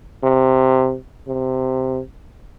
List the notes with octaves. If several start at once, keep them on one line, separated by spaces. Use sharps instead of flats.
C3
C3